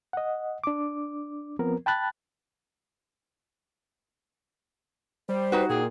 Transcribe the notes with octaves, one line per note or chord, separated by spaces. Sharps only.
D#5 F#5
D4 D6
F3 B3 C4 A#4
G5 A5 B5 F#6 A6
G3 C5
D#4 F#4 B4
A#2 G#4 G5